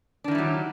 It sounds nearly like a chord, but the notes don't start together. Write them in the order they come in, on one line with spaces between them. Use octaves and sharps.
D4 D#3 E4 G3 F#3